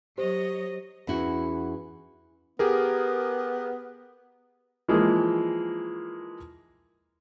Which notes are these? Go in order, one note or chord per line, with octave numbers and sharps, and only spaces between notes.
F#3 G4 C5 C#5 D#5
E2 C#4 E4 F#4
B3 G4 G#4 A#4
E3 F3 G#3 A#3